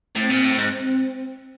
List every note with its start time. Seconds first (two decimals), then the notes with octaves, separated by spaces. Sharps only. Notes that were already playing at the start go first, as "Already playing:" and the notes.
0.15 A2 C4
0.30 A#2
0.44 A2
0.59 G#2